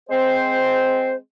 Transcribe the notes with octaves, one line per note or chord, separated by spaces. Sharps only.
G#3 C4 C5